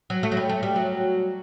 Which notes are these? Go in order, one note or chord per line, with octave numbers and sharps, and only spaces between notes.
F#3
A3
F#3
G3
A3
G3
F#3